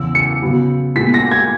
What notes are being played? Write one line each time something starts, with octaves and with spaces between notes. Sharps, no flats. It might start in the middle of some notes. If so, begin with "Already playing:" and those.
Already playing: E2 C#3 E3 E6
C#7
C#3 F#3 B3
A#2 G#3 B3 B6
A#6
G#6